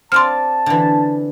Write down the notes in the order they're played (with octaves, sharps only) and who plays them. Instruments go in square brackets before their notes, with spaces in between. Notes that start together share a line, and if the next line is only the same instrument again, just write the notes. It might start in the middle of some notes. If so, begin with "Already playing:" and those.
[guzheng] C4 F4 D5 [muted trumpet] A5 [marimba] C6 F6
[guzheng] D3 E3